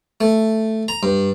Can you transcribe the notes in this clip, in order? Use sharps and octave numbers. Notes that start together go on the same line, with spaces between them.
A3
A#5
G2